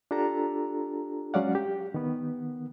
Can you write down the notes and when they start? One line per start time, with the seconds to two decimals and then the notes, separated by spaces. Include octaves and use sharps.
0.11 D4 F4 G4 A4 A#5
1.34 F#3 G#3 C#4 D5 F5 F#5
1.55 G4
1.94 D#3 B3